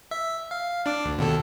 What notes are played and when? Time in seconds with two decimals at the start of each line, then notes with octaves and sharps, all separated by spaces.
0.11 E5
0.51 F5
0.86 D4 D6
1.05 D2
1.18 D#2 B2 A4